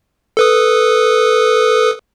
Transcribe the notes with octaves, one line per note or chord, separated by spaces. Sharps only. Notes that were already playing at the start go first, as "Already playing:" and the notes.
A4 B4 D#6